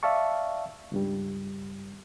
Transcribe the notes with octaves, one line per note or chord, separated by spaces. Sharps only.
D5 E5 F5 A5 C#6
C#2 G2 G3